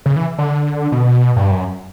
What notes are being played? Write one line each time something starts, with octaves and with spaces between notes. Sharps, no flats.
C#3
E3
D3
B2
G2
F#2